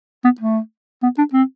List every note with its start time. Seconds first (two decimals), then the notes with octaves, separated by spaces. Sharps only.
0.24 B3
0.40 A3
1.03 B3
1.18 D4
1.33 C4